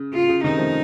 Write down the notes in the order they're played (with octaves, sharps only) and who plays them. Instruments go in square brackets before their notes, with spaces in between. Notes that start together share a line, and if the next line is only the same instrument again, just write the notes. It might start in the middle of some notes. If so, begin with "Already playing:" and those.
Already playing: [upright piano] C#3
[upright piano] C#3 [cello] F4
[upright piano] C#3
[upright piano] C3 D#3 [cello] D#4
[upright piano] F3 A3